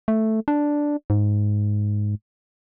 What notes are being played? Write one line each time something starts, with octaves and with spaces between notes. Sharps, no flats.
A3
D4
G#2